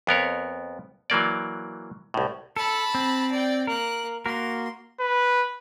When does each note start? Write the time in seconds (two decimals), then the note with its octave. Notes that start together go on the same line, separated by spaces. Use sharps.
0.07 F2 B3 A#4 C#5
1.10 E3 F#3 A#3 D5
2.14 C2 A2
2.56 A4 A5 B5
2.95 C4
3.31 D5 G5
3.67 A#3 A#4 F#6
4.26 A#3 F#4 A#4 C6
5.00 B4